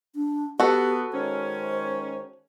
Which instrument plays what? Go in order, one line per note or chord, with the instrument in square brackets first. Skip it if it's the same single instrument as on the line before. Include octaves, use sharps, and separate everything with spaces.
[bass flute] D4
[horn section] B3 [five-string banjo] F#4 A4 [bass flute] G4
[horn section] D#3 G#3 C#4 [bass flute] C5